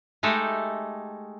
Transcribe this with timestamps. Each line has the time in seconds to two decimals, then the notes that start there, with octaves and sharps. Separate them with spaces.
0.23 G#3 A3 D#4 G4 A4